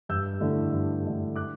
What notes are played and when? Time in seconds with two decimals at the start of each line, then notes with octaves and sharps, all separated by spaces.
0.09 G2 E6 G6
0.40 D3 A3 E4
0.73 G2
1.04 D3 A3 E4
1.36 D6 F#6